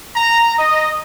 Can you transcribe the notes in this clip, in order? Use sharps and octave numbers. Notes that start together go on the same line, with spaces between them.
A#5
D#5